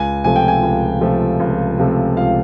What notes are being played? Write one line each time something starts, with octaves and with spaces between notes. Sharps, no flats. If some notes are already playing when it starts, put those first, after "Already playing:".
Already playing: C#2 G#5
C3 F3 A3 G#5
G5
G#5
C#2
C3 F3 A3
C#2
C3 F3 A3
C#2 F5